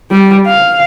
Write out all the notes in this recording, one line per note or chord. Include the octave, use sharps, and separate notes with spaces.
G3
F5